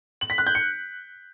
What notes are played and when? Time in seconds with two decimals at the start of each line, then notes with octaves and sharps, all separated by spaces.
0.21 F#7
0.30 B6
0.38 F#6
0.47 G6
0.55 C#7